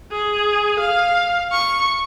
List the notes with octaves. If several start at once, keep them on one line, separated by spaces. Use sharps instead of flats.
G#4
F5
C#6